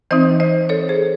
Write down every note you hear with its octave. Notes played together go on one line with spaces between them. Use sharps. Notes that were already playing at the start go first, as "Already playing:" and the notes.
E3 C4 D#4 C5 D#5
C5 D#5
A4 C#5
G#4 C5